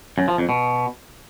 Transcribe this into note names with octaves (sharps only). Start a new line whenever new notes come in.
F#2
F3
F2
B2